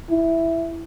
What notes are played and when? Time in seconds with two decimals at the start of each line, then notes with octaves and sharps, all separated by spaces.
0.10 E4